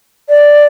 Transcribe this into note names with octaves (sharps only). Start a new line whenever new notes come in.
D5